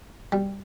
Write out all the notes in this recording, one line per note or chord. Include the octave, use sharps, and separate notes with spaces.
G3